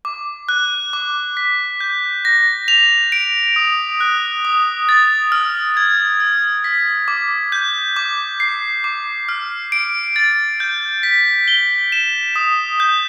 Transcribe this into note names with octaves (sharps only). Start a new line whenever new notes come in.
D6
F#6
D6
B6
G6
A#6
F7
D7
D#6
F#6
D#6
A6
F6
G#6
F6
B6
D6
G6
D6
C7
D6
F6
D7
A6
G6
B6
G7
E7
D#6
G6